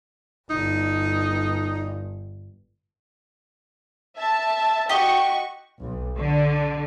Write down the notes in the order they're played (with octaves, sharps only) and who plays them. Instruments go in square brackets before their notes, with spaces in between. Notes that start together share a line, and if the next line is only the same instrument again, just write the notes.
[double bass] G1 [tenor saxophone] D#4
[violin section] E5 A5
[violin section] F#4 C#6 [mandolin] G4 D#5
[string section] B1
D3